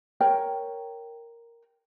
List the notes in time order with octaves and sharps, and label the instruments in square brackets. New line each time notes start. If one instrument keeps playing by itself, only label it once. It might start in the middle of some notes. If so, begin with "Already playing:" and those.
[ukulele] A#4 C#5 G5